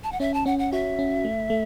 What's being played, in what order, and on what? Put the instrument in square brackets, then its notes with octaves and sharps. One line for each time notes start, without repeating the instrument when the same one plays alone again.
[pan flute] A5
F#5
[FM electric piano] C#4 [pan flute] E5
[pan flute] A5
[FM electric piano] C#4 [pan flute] F#5
[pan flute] F#5
[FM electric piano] F#4 [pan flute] E5
[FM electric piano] C#4
A3
A3